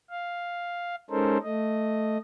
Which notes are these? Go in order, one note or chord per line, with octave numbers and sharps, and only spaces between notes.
F5
G#3 C#4 D#4 A4 A#4 C5
A3 D#5